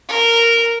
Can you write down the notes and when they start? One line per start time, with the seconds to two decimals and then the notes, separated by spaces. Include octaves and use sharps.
0.09 A#4